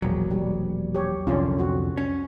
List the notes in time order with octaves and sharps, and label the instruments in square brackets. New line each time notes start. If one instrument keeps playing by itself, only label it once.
[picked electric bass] E1 A#1 [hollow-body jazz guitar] F#3
[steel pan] G3
G4 C#5
[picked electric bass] C2 F2 D3 [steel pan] C#4 F4
[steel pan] C4 F#4
[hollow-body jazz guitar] C#4